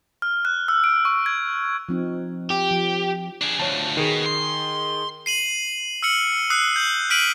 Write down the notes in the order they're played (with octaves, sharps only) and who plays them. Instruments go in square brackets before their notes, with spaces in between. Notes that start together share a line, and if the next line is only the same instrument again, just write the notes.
[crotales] F6
F#6
E6
D7
C#6
G#6
[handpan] F3 C4 D#4
[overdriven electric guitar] G4
[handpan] F3
[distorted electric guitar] D4 G#4
[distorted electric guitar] D2 F3 [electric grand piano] C#5 A5
[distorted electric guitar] B2 [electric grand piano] D#3 G#4
[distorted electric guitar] C6
[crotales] C7 D#7 F#7
E6 F6 C#7 F#7
D#6 E6 F#6 C7
G6 F#7
F6 B6 D7 D#7 F#7